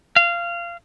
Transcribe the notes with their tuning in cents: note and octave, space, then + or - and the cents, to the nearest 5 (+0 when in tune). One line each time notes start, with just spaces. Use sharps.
F5 -20